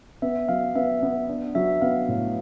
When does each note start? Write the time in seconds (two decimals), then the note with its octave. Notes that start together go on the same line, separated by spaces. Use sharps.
0.22 B3 E5
0.49 F#3 F5
0.75 B3 E5
1.03 B3
1.29 D4
1.55 F#3 E5
1.82 B3 F5
2.08 A2